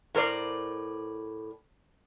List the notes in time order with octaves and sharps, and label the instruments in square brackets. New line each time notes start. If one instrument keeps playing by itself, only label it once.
[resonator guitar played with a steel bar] A2 A#4 C5 D5